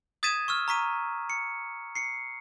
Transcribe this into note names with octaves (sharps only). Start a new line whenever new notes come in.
D#6 G#6 A6 B6 D#7 E7
C#6 E6 F6
A#5 C#6 B6 D#7
C#7
C7 C#7